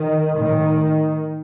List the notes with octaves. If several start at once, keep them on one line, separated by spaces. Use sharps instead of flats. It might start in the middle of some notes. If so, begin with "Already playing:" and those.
Already playing: D#3
A2 D#3